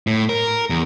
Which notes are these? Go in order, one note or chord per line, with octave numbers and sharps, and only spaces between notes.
A2
A#4
E2